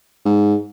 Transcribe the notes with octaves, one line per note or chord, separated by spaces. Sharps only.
G#2